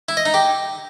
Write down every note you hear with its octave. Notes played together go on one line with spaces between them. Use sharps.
E4
D#5
D#4
G4